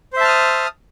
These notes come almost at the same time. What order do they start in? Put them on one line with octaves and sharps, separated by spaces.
C5 E5 A5 F6 D#6